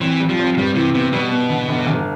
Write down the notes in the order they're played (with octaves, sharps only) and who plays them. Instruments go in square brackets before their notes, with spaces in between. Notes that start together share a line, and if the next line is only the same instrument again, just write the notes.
[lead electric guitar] E3 [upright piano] C4
[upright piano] G3
[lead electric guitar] F3
[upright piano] C4
[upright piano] G2 [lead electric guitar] G3
[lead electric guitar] C3 [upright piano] E3
[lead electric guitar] C3 [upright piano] B3
[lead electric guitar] B2 [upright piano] G3
[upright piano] B3
D3
G1
G1